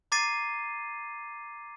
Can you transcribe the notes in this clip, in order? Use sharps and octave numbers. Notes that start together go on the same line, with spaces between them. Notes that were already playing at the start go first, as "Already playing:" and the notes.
A#5 D6 G#6 A6 C7 D#7